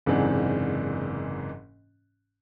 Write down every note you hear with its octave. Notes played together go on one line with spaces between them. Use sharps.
F#1 G#2 C3 E3 D4